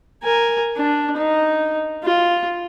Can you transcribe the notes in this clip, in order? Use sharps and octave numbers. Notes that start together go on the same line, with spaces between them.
A#4 G#5
D4
D#4
F4